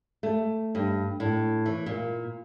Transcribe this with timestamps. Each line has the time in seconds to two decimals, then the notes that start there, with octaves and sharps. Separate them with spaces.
0.23 A3
0.75 G2
1.20 A2
1.66 E3
1.86 A#2